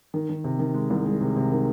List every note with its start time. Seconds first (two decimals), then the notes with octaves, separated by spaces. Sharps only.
0.14 D#3
0.29 D#3
0.44 C3
0.59 D#3
0.74 G#3
0.90 C2
1.06 G#3
1.21 C3
1.36 C3
1.52 D#3